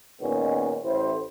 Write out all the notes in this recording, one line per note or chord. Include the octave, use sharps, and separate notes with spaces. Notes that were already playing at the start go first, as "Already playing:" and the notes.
A#2 D#3 G#3 B3 C#4
A1 A2 E4 C5